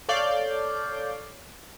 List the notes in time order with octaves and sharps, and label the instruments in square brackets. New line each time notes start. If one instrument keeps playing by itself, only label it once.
[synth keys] A4 C#5 D5 F5 G6